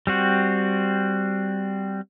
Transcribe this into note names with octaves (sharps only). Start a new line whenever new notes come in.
G3 C4 F#4